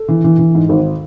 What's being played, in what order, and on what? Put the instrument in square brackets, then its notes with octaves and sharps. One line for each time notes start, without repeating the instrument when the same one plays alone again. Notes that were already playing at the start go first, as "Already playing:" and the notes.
Already playing: [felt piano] A4
E3
E3
E3
G#2
G#1